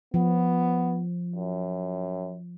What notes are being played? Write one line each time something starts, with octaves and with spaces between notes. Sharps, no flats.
F3 B3
F#2